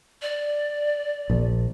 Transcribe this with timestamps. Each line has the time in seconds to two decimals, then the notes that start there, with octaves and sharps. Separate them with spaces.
0.22 D5
1.30 A#1